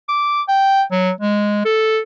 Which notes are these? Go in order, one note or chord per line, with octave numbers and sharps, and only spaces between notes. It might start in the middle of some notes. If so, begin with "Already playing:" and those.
D6
G5
F#3
G#3
A4